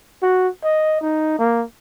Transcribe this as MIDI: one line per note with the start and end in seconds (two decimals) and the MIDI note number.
0.22 0.48 66
0.64 0.98 75
1.01 1.37 63
1.39 1.63 58